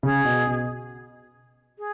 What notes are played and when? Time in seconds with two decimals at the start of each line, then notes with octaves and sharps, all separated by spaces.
0.03 C#3 G#4
0.25 B2
0.47 B2
1.78 G#4